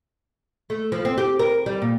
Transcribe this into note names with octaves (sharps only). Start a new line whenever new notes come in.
A3
F3
C4
G4
A#4
G3
A#2